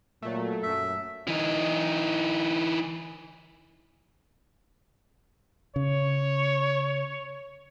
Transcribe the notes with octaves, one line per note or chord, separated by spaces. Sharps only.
A#2 F#3 A3
F#2 E5
E3 D#4
C#3 C#5